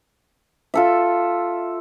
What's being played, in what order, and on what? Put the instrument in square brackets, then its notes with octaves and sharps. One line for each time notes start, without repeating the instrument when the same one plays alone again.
[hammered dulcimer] F4 A4 E5